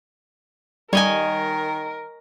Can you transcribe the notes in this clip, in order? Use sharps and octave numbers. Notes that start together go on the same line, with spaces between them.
D#3 G3 A#4 C#5 D#5 G#5